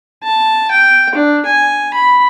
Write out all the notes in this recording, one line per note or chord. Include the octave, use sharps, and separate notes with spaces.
A5
G5
D4
G#5
B5